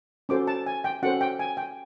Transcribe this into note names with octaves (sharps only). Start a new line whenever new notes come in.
C#4 F#4 A4 C5 D6
A5
G#5
G5
C#4 F#4 A4 C5 F#5
G5
G#5
G5